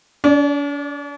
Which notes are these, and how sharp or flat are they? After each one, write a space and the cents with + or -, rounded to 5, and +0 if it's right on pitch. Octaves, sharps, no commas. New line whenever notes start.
D4 -45 D5 +0